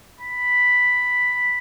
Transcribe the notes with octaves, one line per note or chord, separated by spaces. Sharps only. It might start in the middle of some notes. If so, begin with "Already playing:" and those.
B5